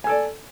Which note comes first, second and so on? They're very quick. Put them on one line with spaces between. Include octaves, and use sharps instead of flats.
G#5 A4 D5